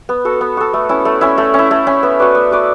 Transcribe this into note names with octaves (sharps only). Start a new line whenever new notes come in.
B3
F#4 A4
B3
F#4 A4
A3
C#4 E4
A3
C#4 E4
A3
C#4 E4
A3
C#4 E4
B3
F#4 B4 D5
B3
F#4 B4 D5